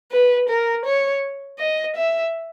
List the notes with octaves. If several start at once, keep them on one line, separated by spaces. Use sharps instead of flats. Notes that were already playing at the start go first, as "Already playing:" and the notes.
B4
A#4
C#5
D#5
E5